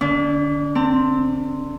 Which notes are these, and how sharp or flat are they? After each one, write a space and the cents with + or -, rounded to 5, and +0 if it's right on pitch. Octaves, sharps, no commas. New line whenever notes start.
D3 +15 D4 -45
C4 +0 A5 +40